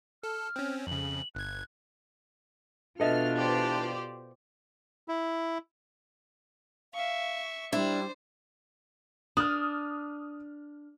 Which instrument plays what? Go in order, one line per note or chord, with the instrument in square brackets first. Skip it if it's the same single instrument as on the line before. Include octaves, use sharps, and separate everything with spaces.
[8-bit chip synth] A4 [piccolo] F6
[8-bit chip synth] C4 C#4
[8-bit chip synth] F2 C#3 [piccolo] F#7
[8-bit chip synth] G1 G#6 [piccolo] F#6
[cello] B2 F4 [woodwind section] E3 D4 [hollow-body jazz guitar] A4 D#5 E5 [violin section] F6
[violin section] G4 C5 D5
[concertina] E4
[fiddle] E5 C#6 [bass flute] F5
[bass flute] G3 [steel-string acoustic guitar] D4 [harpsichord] E4 [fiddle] C5
[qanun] D4 [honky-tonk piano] D#6 F6